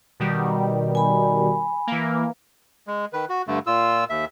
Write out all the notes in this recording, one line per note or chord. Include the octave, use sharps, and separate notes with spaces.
B2 D#3 G3
G#5 B5
E3 A#3
G#3
D#3 B4
F#4
G2 D3 A3
A#2 F4 E6
D#2 E5